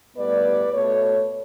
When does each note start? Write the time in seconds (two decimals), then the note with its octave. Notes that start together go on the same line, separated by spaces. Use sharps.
0.17 A2 G3 B3 B4 D5
0.73 B2 A3 A4 C#5